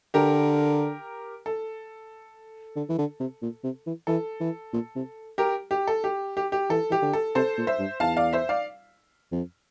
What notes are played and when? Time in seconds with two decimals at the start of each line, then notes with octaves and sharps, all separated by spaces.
0.14 D3 G4 A#4
1.46 A4
2.76 D3
2.89 E3
2.98 D3
3.20 C3
3.42 A#2
3.63 C3
3.86 E3
4.07 E3 A4
4.40 E3
4.73 A#2
4.95 C3
5.38 G4 A#4
5.71 G4
5.87 A4
6.04 G4
6.37 G4
6.52 G4
6.70 E3 A4
6.90 E3 G4
7.02 D3
7.13 A4
7.35 C3 A4 C5
7.57 A#2
7.67 C5 E5
7.79 G2
8.00 E2 F5 A5
8.17 D5 F5
8.33 C5 E5
8.49 D5 F5
9.32 F2